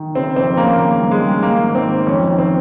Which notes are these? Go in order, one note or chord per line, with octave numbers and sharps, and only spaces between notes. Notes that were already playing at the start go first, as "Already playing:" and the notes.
Already playing: D#3
C#3 C4
F2 C4
C#3 A#3
D#3 A#3
G2
G#3
D#3
D#3 A#3
G#2
C4
D#3
F2 C#4
D#3
C4